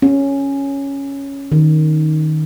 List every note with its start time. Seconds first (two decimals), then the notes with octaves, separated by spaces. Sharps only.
0.02 C#4
1.52 D#3